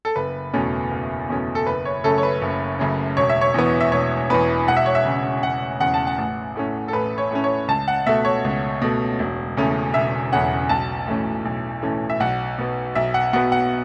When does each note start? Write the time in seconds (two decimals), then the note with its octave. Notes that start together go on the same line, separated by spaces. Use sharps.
0.05 A4
0.16 F#1 B4
0.54 E2 B2 A3 C#4
0.91 F#1
1.29 E2 B2 A3 C#4
1.55 A4
1.66 F#1 B4
1.85 C#5
2.04 F#2 C#3 A3 C#4 A4
2.18 C#5
2.23 B4
2.42 F#1
2.79 F#2 C#3 A3 C#4
3.17 E1 C#5
3.29 E5
3.41 C#5
3.54 E2 E3 B3
3.81 E5
3.92 E1 C#5
4.30 E2 E3 B3 B4
4.68 E1 F#5
4.77 E5
4.86 C#5
4.95 E5
5.05 E2 C#3
5.43 E1 F#5
5.80 E2 C#3 F#5
5.94 A5
6.07 F#5
6.18 A1
6.56 A2 A3 C#4
6.88 A4
6.93 A1 B4
7.18 C#5
7.31 A2 A3 C#4
7.44 C#5
7.68 C#2 A5
7.88 F#5
8.06 B2 A3 E5
8.25 C#5
8.44 C#2
8.82 B2 A3
9.19 E1
9.57 E2 C#3 A3 C#4
9.94 E1 E5
10.32 E2 C#3 A3 C#4 F#5
10.69 B1 A5
11.07 A2 E3 A3 C#4
11.45 B1
11.82 A2 E3 A3 C#4
12.10 E5
12.20 B1 F#5
12.58 B2 B3
12.95 B1 E5
13.14 F#5
13.33 B2 B3 F#5
13.52 F#5